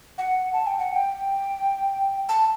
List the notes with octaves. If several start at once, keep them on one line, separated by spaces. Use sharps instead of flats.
F#5
A5
G5
F#5
G5
A5